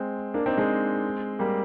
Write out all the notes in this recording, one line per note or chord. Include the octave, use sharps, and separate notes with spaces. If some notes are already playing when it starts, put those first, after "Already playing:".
Already playing: G#3 C4
A#3 D4
C4 D#4
G#3 C4
G3 A#3